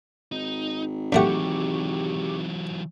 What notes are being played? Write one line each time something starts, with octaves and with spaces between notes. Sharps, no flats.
G#1 D#4
F#2 E3 F#3 A3 G4 F#5 C#6 D6